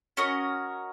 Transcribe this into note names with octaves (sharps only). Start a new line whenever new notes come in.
C#4 F#4 A#4 D#5